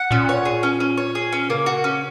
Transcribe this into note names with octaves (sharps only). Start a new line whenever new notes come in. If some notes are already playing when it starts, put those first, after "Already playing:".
Already playing: F#5
A#2 C#4
C#5
G#4
C#4
C#4
C#5
G#4
C#4
C#3 A#3
F#4
C#4